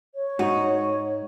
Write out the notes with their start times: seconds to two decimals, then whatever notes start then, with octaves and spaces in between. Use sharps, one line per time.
0.15 C#5
0.39 G#2 D#4 F#4